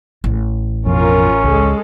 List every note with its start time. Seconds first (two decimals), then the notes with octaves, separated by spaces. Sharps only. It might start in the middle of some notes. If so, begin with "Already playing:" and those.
0.24 A1
0.86 F2 B2 C#4 F4 A#4
1.44 C#2 G#3 A4